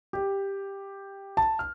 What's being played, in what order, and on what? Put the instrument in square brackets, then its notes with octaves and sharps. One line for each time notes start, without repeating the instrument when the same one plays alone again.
[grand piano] G4
A5
F6